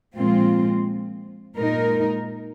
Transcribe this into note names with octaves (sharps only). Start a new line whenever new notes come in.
A#2 F3 G#3 C4 F4
A#2 G#3 D#4 A#4